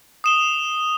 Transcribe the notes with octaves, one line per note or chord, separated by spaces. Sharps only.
D#6 E7 G7